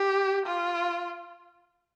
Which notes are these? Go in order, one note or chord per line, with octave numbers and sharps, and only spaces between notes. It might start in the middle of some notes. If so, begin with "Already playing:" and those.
Already playing: G4
F4